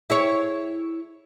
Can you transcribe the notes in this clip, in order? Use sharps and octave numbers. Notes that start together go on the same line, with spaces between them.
E4 G#4 C#5